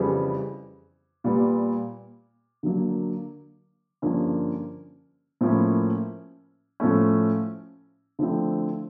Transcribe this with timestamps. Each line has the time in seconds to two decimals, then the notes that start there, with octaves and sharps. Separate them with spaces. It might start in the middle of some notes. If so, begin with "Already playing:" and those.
Already playing: F2 C#3 E3 G3 B3
1.24 A#2 G3 B3
2.63 D3 F#3 A#3
4.02 G2 D3 F3 A#3 C#4
5.41 A2 F3 A#3 C#4 E4
6.80 A2 F3 A3 C#4
8.19 D3 F3 A3 C4 E4